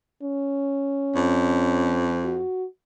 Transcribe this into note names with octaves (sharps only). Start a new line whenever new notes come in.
C#4
F2
F#4